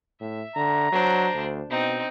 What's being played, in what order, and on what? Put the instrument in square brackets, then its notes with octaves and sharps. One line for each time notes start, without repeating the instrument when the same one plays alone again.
[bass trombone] A2 [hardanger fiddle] E5
[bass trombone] D3 [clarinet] A#5
[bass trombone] F#3 [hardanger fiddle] D4 C5
[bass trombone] D2
[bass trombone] B2 [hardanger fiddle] C4 D#4